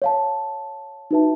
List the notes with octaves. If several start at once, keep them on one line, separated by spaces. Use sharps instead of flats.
C#5 F5 A5
D#4 F#4 B4 E5 A5